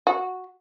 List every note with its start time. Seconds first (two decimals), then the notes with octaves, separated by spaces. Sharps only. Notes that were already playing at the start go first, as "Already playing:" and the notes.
0.07 F#4